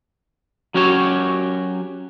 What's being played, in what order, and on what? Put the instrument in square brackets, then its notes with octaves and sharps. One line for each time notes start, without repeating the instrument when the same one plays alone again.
[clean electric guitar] F#3 C#4 F#4 G4 C#5